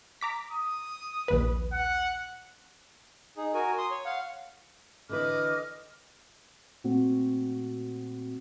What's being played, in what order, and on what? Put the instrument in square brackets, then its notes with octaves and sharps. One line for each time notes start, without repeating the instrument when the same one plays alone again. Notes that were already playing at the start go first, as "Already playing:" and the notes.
[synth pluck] A#5 D6 B6
[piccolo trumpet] D#6
[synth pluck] A#1 D#2 B4
[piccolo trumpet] F#5
[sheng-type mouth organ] D#4 G#4
F#4 A#4 G#5
C6 D#6
C#5
F5 F#5
[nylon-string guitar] D3 E3 B4 [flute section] D#5 D6 F6
[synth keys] A#2 A3 C4 F#4